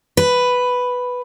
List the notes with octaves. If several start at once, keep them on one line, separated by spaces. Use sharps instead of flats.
B4